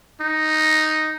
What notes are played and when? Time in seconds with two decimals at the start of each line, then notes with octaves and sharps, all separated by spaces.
0.21 D#4